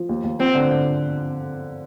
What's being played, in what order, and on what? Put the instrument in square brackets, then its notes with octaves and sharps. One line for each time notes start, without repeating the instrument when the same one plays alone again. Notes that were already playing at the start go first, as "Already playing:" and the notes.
Already playing: [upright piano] F3
D#2
D#2
[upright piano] F3 [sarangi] C4
[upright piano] D3
D3